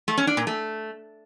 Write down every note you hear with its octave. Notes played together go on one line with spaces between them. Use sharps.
A3
C#4
D4
A#2
A3